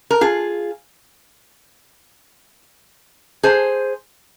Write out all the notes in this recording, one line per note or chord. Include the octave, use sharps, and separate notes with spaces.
A#4
F4 G#4
G#4 C5